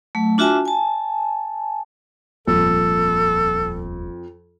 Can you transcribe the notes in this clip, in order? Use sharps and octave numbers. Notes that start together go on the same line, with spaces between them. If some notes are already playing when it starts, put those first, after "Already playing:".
F#3 A3
D4 F4 F#4 E5 G#5 A5
G#5 A5
D#1 G#1 F2 A4